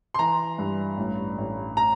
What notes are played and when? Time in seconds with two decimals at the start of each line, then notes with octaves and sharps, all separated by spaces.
0.14 C6
0.19 E3 A#5
0.58 G2
0.98 A1
1.38 A1
1.77 A#5